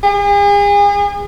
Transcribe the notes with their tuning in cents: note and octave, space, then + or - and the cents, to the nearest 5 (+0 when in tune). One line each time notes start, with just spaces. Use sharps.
G#4 -40